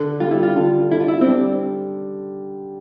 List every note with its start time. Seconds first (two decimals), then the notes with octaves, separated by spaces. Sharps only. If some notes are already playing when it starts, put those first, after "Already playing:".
Already playing: D3
0.20 G3 F4
0.31 E4
0.43 F4
0.56 D3 F4
0.92 D3 E4
1.00 F4
1.08 E4
1.21 C4
1.27 G3 D4